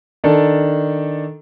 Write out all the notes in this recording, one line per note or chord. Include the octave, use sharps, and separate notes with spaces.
D#3 D4 A4